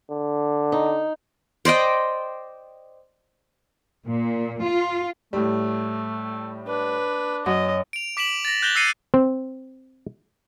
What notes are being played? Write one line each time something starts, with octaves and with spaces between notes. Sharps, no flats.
D3
D#4
C5 D5 D#5 G5
A#2
F4
A2 G3 A3
D4 B4
F#2 D#5
D7 F7
D6 B6 D7 E7 F#7
A6 A#6
F#6 G6 A#6 E7 F7 G7
E6 A6 A#6 C7 C#7 D#7
C4